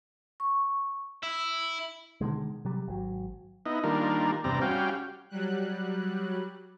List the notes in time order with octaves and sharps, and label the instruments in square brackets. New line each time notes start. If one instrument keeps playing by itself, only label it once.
[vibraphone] C#6
[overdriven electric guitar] E4
[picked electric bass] B2 D3 D#3 G#3
C3 F#3 G3
G#1 F#3
[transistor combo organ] B3 D#4 E4 D#5
D#3 G3 A#3 D4 F4 A#4
E2 G2 C3 C4 D5 A#5
G3 C#4 F#4 F5 G5
[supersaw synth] F#3 G3 F#6